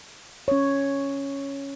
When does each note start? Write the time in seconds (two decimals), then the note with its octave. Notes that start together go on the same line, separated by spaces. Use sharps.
0.48 C#4 C#5